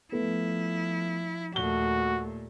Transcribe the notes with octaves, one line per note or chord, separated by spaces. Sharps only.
F3 A3 B3 E4
D#2 A#2 A3 F#4 G7